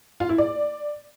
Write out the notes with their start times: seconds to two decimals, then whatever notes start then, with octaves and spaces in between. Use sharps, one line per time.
0.20 F4
0.29 E4
0.38 D5